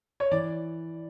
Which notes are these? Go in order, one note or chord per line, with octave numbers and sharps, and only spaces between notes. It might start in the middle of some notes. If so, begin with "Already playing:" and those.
C#5
E3 D5